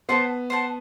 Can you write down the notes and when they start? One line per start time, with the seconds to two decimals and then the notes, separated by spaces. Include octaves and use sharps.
0.09 B3 C5 F#5 A5
0.50 C5 F#5 A5